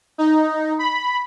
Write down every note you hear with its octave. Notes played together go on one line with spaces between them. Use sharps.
D#4
B5